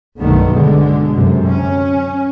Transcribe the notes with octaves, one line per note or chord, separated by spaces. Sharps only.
B1 G2 B2 D#3 A3 B3
B2 D3 G#3
F#2 C3
C#4